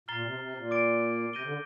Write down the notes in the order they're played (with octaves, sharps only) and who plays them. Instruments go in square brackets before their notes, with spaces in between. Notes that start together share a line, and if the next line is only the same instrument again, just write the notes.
[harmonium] A#2 [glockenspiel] A#5 F6 A6 C7 G7
[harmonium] C3
C3
A#2
[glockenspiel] D6 A6 D7
[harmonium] C3 [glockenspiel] G6 A#6 D#7 G7
[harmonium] D3